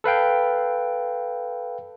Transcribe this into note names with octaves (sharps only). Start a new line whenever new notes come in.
A4 B4 F5 G5